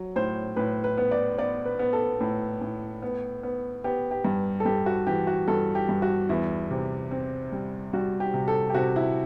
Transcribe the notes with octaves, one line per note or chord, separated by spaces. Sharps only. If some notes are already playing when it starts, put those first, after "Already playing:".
Already playing: F#3
A2 C5
A2 B4
B4
B3
D5
B3 D5
B4
B3
A4
A2
A2
B3
B3
B3 G4
G4
G2
A4
G2 G4
F#4
E3 G4
F#4
G2 A4
G4
G2
F#4
E2 E4
C3
C4
G3
G3 F#4
G4
C3
A4
G4
C3 F#4
E4